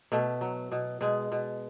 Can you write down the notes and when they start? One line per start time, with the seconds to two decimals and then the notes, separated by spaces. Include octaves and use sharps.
0.12 B2 A3
0.41 F#3
0.72 B2
1.01 B2 G#3
1.32 B2